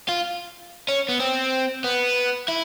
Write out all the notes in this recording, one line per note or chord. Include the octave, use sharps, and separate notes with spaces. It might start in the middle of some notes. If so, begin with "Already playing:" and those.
F4
C#4
B3
C4
B3
E4